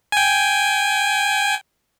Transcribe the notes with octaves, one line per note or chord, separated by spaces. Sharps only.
G5 G#5